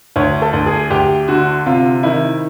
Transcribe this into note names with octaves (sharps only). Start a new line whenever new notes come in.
D2 C#5
A4
D2
G#4
D2 G4
D3 F#4
C3 F4
D#3 E4